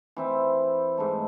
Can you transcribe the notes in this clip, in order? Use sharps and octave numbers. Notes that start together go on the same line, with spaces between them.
E3 C4 E4
G#2 E3 A3